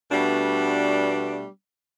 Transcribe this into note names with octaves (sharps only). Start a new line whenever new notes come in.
B2 G3 A3 B3 D4